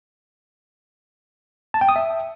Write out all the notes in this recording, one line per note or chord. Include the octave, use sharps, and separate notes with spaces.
A5
G5
D#6
E5